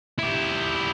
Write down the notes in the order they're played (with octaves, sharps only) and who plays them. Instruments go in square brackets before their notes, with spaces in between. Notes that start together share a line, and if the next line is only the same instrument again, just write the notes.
[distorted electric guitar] E4 G4